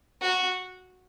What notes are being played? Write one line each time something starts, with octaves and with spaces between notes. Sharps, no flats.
F#4